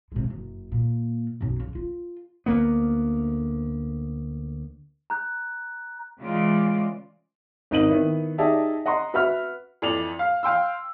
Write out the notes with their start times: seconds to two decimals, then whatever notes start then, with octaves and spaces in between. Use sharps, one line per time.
0.12 C3 G#3
0.28 F#1 F#2
0.72 A#2
1.41 B1 F#2
1.60 C#3
1.75 F4
2.46 D2 A#3 B3
5.10 A#5 F#6 G6
6.21 C#3 E3 G#3 F4 D5
7.71 G#1 D#4 D#7 F#7
7.89 D#3 B3 E4
8.38 D#4 G4 G#4 D5 E5 A5
8.86 D#5 F#5 A#5 C6
9.14 F#4 B4 E5 F#5 B5 F6
9.82 F2 E3 D5 F7 F#7
10.19 F5
10.43 F5 G5 C6 E6